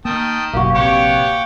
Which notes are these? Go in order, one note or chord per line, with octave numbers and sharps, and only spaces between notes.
D#3 A#3 G5 A5 D#6
F#1 B1 A#3 F#4 G4
A#1 C3 B3 G4 C#5 F#5 G5 D6